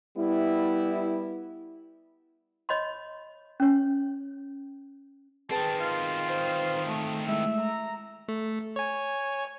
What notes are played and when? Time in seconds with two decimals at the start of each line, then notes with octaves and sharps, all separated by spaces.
0.18 G3 B3 E4
2.69 C#5 D#5 B5 C6
3.60 C#4 C#5
5.51 D#3 C4 G#4 B4 G5 A5
5.80 F4
6.28 C5
6.87 A3
7.28 G#3 A3 E4 E5
7.60 A#5
8.28 A3
8.76 C#5 G#5